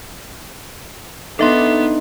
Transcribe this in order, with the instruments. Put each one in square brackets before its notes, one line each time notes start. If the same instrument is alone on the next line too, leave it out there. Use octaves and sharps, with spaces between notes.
[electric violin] B3 [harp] D4 D#4 [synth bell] A4 E5 C6